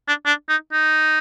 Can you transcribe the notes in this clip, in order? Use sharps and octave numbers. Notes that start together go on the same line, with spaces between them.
D4
D4
D#4
D#4